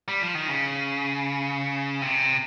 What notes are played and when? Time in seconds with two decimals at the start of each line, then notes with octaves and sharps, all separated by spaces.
0.08 G3
0.22 F3
0.35 D#3
0.48 C#3
2.02 C3